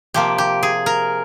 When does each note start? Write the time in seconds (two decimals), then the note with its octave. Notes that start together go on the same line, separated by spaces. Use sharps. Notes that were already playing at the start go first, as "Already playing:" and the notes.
0.14 C3 F3 A#3 G4
0.38 G4
0.63 G#4
0.86 A#4